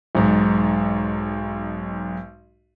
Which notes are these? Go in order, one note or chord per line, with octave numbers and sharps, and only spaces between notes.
B1 G#2